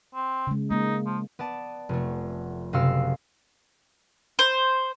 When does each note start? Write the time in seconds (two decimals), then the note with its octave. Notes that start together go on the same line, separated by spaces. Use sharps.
0.15 C4
0.47 C#3 G#3
0.71 G#3 A#3 D#4
1.06 F3
1.39 B3 D5 A5
1.89 F1 A3
2.73 F#1 C3 F#4 F5 E6 E7
4.39 C5